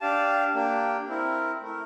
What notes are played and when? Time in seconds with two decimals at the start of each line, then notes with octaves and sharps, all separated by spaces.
0.01 D4 G4 D5 F5 A5
0.54 A#3 D4 G4
1.08 C4 E4 A#4
1.61 A3 E4 A#4